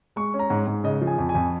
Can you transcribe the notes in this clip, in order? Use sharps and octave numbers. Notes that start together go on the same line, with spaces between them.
G#3 C#6
C#4
A#5
G#2
G#2
C#3 D#5
F3
G#5
F2
G#5
F2